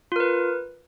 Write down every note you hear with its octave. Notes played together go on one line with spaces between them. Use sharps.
F4 A#4 B4